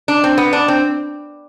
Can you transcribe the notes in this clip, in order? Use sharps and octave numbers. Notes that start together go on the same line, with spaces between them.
D4
C4
B3
D4
C4